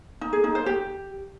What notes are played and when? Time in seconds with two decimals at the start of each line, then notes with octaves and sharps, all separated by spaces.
0.21 D#4
0.33 G#4
0.44 D#4
0.55 C5
0.66 G4